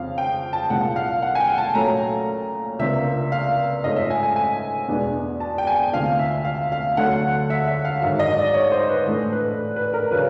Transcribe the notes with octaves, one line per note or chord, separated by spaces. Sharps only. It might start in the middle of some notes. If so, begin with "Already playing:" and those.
Already playing: F2 C#3 F3 F5
G5
A5
C2 A#2 F3 G#3 F#5
F5
F#5
G#5
G5
A5
A#2 F#3 A3 C#4 A#5
C#2 C3 F3 A#3 D4 E5
F5
G#2 F3 A3 C#4 D#5
E5
G#5
G#5
G#5
E2 B2 G#3 B3 D4
A5
G5
G#5
G5
D2 C3 F3 F5
E5
F5
F5
D2 D3 F#3 A3 F#5
E5
E5
F5
G#2 D#3 F#3 E5
D#5
D5
C#5
C5
B4
A2 E3 A3 D4
B4
B4
A#4
C#3 F#3 A3 D4 B4